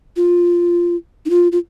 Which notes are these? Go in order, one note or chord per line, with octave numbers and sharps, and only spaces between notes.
F4
D#4
F4
F4